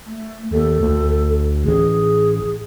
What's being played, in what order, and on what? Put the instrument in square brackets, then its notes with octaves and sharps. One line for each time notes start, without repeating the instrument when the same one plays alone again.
[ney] A3
[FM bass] D#2 [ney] A4
[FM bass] D2
[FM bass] A1 [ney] G#4